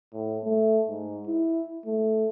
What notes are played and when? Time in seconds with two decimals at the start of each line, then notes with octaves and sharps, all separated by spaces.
0.14 A2
0.44 A3
0.89 G#2
1.27 E4
1.86 A3